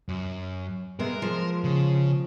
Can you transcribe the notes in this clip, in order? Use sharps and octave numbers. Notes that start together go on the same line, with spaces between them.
F#2
C3 G#3 B3 A#4
F3 G#3
C#3